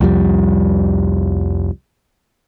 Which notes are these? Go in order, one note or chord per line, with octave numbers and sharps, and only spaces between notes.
C2 F2 F3 G3